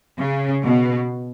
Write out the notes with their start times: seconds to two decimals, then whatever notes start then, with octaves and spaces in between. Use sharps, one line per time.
0.19 C#3
0.64 B2